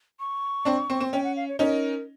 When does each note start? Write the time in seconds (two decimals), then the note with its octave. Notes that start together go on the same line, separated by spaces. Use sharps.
0.20 C#6
0.65 C4 D4
0.90 C4
1.00 C4
1.13 C#4 G5
1.24 F#5
1.36 F5
1.48 C#5
1.59 C#4 D#4 A#4 C5